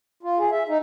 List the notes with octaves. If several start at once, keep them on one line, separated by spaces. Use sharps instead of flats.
F4
G#4
E5
D#4